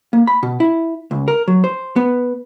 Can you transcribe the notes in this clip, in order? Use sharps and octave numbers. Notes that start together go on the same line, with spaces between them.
A#3
B5
B2
E4
C#2
A#4
F#3
C5
B3